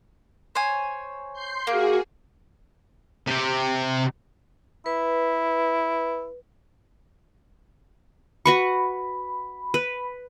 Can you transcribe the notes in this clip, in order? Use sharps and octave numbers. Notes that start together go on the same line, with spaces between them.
C5 C#5 G#5
C6 G6 C7
A#3 F#4 G#4
C3 G4
E4 B4
F#4 B4 B5 C#6
B4